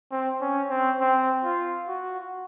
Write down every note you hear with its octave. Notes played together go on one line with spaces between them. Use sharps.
C4
C#4
C4
C4
F4
F#4